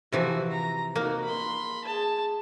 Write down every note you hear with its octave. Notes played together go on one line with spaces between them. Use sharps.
C3 E3 F3 F#4
A#5
A#3 D#4 F#4
B5 C6
G#4 A5